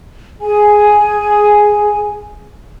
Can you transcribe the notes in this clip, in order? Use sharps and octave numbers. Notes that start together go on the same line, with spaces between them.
G#4 G#5